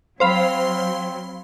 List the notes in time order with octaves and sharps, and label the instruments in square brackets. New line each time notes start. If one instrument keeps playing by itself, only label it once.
[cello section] F#3 [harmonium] C4 [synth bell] C5 F5 B5